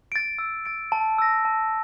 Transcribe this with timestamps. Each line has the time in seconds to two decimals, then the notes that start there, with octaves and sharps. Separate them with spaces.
0.12 A6 D7
0.38 E6
0.66 A6 D7
0.92 A5
1.18 E6 A#6
1.45 A5